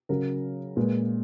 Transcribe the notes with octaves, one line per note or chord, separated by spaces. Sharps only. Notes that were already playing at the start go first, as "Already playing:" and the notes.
C#3 F#3 A#4
A#2 G#3 B4